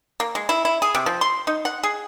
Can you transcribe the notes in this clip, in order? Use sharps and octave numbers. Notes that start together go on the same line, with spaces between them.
A#3
G#3
E4
E4
G#4
C3
F3
C6
D#4
F#5
G#4